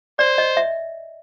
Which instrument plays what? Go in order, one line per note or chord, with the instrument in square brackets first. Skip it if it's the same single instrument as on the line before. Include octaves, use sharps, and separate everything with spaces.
[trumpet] C5 [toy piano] D5
[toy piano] D#5
E5